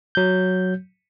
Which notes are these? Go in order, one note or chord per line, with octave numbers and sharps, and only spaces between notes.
F#3 G6